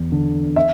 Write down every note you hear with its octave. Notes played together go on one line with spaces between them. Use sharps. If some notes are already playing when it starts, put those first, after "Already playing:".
Already playing: E2
D3
E5